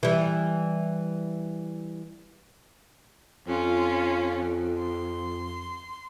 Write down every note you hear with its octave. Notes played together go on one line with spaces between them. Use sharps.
E3 G3
F2 C#4 F4
C6